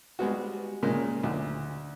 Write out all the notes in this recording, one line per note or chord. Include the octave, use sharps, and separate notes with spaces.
G3 G#3 B3 F#4
A#2 C#3 G#3 A#3
D2